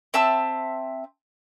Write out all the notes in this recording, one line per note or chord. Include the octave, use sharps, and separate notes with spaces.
C4 E5 A5 E6